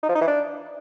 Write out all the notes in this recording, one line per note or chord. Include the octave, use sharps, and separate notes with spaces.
D#4
F3
D#4
E3
D4